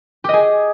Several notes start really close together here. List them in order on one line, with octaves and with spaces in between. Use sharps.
G4 D#5 G#4